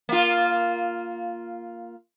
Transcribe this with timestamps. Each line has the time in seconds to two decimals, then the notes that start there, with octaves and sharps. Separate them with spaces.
0.09 A#3 F4